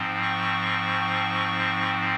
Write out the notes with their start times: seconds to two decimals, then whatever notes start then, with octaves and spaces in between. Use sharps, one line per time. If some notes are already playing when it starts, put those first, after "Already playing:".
Already playing: G#2 F3 C4
0.22 C#6